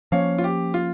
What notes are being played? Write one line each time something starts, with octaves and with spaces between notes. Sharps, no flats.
F3 A#3 C#4 C#5 F5
F4
G4
F4